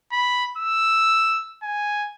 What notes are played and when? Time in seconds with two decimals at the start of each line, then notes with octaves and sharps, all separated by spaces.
0.12 B5
0.57 E6
1.63 G#5